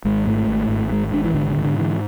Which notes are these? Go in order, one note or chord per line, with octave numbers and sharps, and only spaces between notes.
G#1 G#3
G#2 A3
G#1
G#1
G#2 G#3
G#1 D4
E3
G#2 D3
D3
G#2
D3
D3 E3